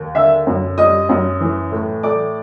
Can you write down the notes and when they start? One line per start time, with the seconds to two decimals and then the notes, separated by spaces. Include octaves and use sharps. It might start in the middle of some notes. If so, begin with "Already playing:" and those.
Already playing: D#2
0.15 D3 E5 E6
0.47 F#2
0.78 G3 D#5 D#6
1.09 F#2
1.41 E3
1.72 A2
2.03 A3 D5 D6